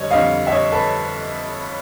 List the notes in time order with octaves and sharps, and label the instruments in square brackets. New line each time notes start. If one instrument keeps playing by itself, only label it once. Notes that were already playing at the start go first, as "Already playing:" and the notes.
Already playing: [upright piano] F2 D3 G3 C#5 D#5
F2 D3 G3 D#5 F5
E5
C#5 D#5
A4 B4